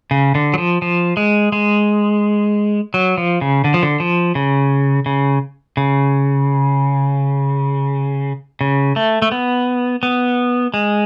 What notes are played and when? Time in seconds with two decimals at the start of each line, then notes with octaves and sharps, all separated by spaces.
0.11 C#3
0.35 D3
0.54 F#3
0.58 F3
0.82 F3
1.17 G#3
1.52 G#3
2.94 F#3
3.18 F3
3.41 C#3
3.64 D3
3.74 F3
3.83 D3
4.00 F3
4.35 C#3
5.06 C#3
5.77 C#3
8.61 C#3
8.96 A3
9.22 A3
9.32 B3
10.03 B3
10.74 G#3